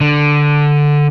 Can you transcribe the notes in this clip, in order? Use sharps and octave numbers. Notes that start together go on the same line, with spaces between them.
D3